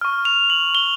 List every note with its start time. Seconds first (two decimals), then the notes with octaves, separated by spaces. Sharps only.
0.01 C#6 F6
0.25 F7
0.50 F#7
0.75 G7